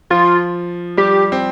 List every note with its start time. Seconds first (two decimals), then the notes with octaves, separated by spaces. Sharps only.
0.10 F3 F4
0.97 G3 G4
1.32 C4